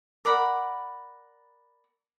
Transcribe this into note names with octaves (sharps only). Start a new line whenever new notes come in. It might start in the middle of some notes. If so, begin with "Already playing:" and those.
A#4 D5 F#5 B5